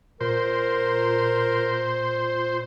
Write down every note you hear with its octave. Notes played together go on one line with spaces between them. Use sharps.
A#2 A#4 C5